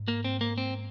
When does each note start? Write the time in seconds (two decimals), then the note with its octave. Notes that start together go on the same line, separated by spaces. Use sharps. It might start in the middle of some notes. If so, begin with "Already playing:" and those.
Already playing: G#2
0.08 A#3
0.24 C4
0.41 A#3
0.58 C4